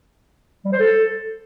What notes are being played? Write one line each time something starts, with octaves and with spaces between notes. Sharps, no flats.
G3
C5
A4